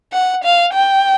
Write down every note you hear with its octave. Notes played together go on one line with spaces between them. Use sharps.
F#5
F5
G5